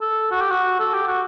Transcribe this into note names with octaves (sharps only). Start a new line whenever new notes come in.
A4
F#4
G4
F#4
A4
G4
F#4